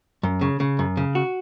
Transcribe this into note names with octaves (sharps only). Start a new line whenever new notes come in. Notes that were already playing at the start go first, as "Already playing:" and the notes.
F#2
C#3
C#3
F#2
C#3
F#4